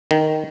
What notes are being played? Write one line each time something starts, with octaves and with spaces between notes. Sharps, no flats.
D#3